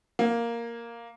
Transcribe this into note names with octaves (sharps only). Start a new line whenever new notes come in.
A#3